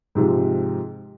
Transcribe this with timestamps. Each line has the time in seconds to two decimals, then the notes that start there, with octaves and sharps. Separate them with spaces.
0.15 G#2 C3 F3 G#3